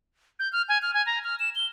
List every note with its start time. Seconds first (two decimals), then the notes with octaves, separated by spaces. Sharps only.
0.39 G6
0.53 F6
0.69 G#5
0.82 F6
0.94 G#5
1.06 A#5
1.24 F6
1.40 E7
1.55 G7